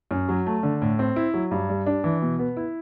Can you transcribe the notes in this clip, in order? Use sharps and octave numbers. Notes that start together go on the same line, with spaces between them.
F#2
F#3
A3
D3
A2
C4
E4
F#3
G2
G3
D4
E3
B2
B3
E4